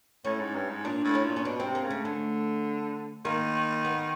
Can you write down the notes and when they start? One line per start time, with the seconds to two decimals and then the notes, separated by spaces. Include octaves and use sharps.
0.25 A2 C#4
0.40 G#2
0.55 G2
0.69 G#2
0.85 A#2 D4
1.04 A2
1.15 C#4
1.25 A#2
1.36 C#4
1.45 B2 D4
1.60 C4
1.65 C3
1.75 A#3
1.85 C#3
1.90 A3
2.05 D3 A3
3.25 D#3 A#3
3.85 B3